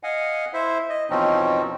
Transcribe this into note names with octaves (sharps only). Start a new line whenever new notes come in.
D#5 F5 F#5 G#5
E4 C5 E5
D#5
E2 B2 F3 C4 C#4 D#4